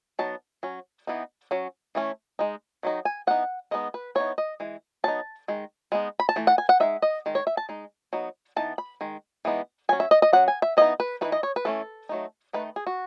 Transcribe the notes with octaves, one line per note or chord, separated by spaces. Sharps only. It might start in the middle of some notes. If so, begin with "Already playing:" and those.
F#3 B3 D#4 A5
F#3 C#4
E3 B3 D#4
F#3 C#4
E3 A3 C#4
G#3 D#4
D#3 F#3 D#4
G#5
E3 B3 D#4 F#5
G#3 B3 D#4 D#5
B4
E3 B3 D#4 C#5
D#5
E3 G#3
F#3 B3 D#4 A5
D#3 G#3
G#3 B3 D#4
B5
A5
E3 A3
F#5
G#5
F#5
G#3 D#4 E5
D#5
D#3 G#3
C#5
E5
A5
G#3 D#4
F#3 B3 D#4
E3 B3 D#4 A5
B5
D#3 G#3
E3 G#3 B3 D#4
F#3 C#4 G#5
E5
D#5
D#5
F#3 C#4 F#5
G#5
E5
E3 B3 D#4 D#5
B4
E3 A3 D#4 B4
D#5
C#5
B4
E3 A3 C#4 A4
F#3 A3 D#4
D#3 A3 D#4 B4
G#4
F#4